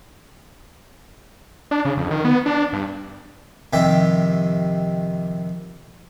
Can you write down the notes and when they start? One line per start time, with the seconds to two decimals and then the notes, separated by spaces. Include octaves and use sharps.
1.71 D4
1.85 C#3
1.97 F2
2.11 D#3
2.25 B3
2.46 D4
2.73 G2
3.73 F2 C3 D#3 G3 G4 E5